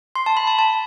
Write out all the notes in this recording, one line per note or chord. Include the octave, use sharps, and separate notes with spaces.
C6
A5
B5
A5
A5